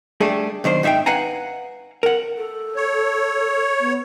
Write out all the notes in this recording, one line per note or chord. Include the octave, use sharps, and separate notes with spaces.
G3 A3 D4 G#4 A4
B1 D#3 D4 C5
G#2 D#4 E5 F5 G5
B4 F5 F#5 G#5 A#5
A#4 F#5
A4
C#5
B3